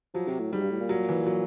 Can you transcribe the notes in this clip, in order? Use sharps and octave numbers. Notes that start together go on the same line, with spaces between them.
F3 F#3
C3
A2
G#2 G3
G2
A2
A#2
F#3
E3
F#3